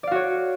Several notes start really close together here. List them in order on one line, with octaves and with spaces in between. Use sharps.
D5 F5 F#4 C#5